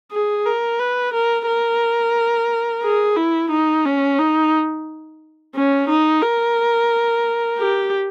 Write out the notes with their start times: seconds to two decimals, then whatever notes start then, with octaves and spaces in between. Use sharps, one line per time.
0.12 G#4
0.46 A#4
0.80 B4
1.13 A#4
1.47 A#4
2.84 G#4
3.17 E4
3.50 D#4
3.85 C#4
4.19 D#4
5.55 C#4
5.89 D#4
6.22 A#4
7.58 G4